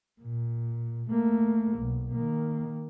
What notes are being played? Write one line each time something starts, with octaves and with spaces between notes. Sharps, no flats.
A#2
A3 A#3
B1
D#3 A#3